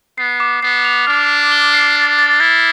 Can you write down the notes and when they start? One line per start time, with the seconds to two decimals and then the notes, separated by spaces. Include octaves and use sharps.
0.18 B3 C7
0.40 D6
0.62 B3 C7
0.85 F7
1.07 D4 F6
1.29 C7
1.52 G7
1.73 C7
1.96 A6
2.19 A6
2.40 E4 A6